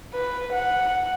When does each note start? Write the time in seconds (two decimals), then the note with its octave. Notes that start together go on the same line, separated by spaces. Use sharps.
0.14 B4
0.53 F#5